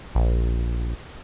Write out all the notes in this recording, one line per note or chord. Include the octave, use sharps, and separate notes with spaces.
A#1